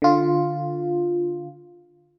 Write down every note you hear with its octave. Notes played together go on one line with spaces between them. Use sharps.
D3 F4